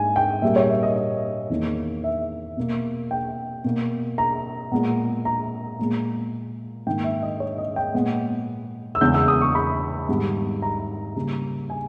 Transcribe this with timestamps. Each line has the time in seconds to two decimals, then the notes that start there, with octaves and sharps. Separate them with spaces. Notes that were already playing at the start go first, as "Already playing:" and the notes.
Already playing: G#2 G#5
0.16 G5
0.42 A#2 G3 A#3 E5
0.56 C#5
0.69 E5
0.83 D#5
0.96 D#5
1.50 E2 D#3 A#3
2.04 E5
2.57 B2 A#3
3.11 G5
3.64 B2 A#3
4.18 A#5
4.72 A#2 G#3 B3
5.25 A#5
5.79 A#2 G#3 B3
6.86 G#2 D#3 A#3 G5
7.04 E5
7.23 D#5
7.40 C#5
7.58 D#5
7.76 G5
7.94 A#2 G#3 B3
8.95 E6
9.01 E2 C#3 G#3 B3 G6
9.14 E6
9.28 D#6
9.41 C#6
9.55 B5
10.09 G#2 D#3 G3 B3
10.62 A#5
11.16 C#3 G3 A#3
11.70 G#5